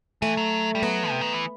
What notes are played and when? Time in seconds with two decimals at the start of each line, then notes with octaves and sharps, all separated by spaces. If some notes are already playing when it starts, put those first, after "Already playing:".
0.22 E3 A3
0.37 F#3
0.75 G3
0.83 F#3 B3
1.10 C3
1.21 D#3
1.33 E3